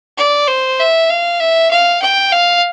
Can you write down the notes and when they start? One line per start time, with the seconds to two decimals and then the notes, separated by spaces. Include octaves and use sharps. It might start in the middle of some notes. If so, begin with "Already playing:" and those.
0.17 D5
0.47 C5
0.79 E5
1.10 F5
1.40 E5
1.71 F5
2.02 G5
2.32 F5